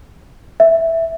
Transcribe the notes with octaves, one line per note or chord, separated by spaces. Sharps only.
E5